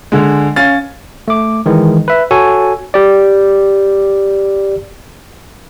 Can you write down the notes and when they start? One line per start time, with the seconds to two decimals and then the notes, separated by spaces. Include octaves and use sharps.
0.12 D3 G#3
0.56 C#4 F5 A6
1.28 A3 D6
1.66 D#3 E3 G#3
2.08 B4 E5
2.31 F#4 A4 C#5 G#5
2.94 G4 D5